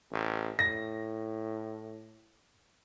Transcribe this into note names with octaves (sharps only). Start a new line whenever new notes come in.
A1
A2 A#6